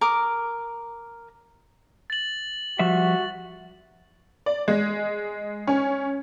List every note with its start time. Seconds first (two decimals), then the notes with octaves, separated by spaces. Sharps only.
0.01 A#4 D6 D#6
2.10 A6 F#7
2.79 F3 G3 F#4 E5
4.46 D5
4.68 G#3
5.67 C#4